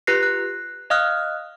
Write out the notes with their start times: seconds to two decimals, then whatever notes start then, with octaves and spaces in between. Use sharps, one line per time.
0.07 F4 G4 B4 F#6 A#6 C7
0.23 F#6
0.90 D#5 F5 D#6 F6 F#6